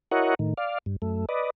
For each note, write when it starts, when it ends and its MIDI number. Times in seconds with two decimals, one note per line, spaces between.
0.11 0.35 64
0.11 0.35 66
0.11 0.35 70
0.11 0.35 73
0.11 0.35 75
0.11 0.35 78
0.39 0.54 45
0.39 0.54 51
0.57 0.78 74
0.57 0.78 77
0.86 0.96 43
1.02 1.25 42
1.02 1.25 57
1.29 1.50 71
1.29 1.50 74
1.29 1.50 75